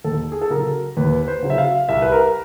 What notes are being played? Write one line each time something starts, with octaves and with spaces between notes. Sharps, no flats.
D#2 A4
G#4
A4
C#3 F#3 A#4
D#2 B4
B4
C5
C#3 F#3
E5
F5
C2 E5
B4
A#4